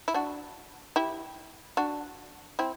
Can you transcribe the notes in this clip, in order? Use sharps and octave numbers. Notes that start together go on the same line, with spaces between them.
E4
D4 F#4
E4 G4
D4 F#4
C4 E4